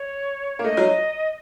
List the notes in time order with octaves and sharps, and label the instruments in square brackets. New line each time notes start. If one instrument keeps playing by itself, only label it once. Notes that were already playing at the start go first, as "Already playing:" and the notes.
Already playing: [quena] C#5
[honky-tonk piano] A#3
[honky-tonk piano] A3 [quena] D#5
[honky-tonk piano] F#3